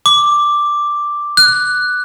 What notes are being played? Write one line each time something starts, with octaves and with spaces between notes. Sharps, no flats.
D6
F#6